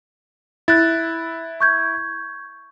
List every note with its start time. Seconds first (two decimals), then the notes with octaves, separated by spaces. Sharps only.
0.68 E4 F#6 A6
1.60 C#6 G6 G#6